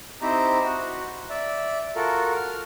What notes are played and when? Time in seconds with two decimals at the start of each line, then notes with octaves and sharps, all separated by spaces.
0.22 C4 D#4 E4 G4 C5 A#5
0.64 F#4
1.30 D5 E5
1.96 F4 F#4 A4 A#4
2.36 F6